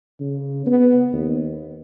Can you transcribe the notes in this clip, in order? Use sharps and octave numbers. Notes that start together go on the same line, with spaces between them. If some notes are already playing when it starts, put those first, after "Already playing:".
C#3
B3
D#2